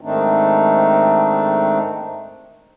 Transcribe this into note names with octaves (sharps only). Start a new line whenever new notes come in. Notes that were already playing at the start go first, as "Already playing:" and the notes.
G#2 D#3 A3 C4 D4 D#4